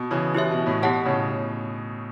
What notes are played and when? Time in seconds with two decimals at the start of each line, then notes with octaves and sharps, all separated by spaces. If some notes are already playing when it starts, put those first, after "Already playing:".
Already playing: B2
0.11 C#3 E3
0.34 E4 G4 C#5 E5
0.51 B2
0.66 A2
0.82 B2 E4 G4 C#5 F#5 A5
1.06 A2 C#3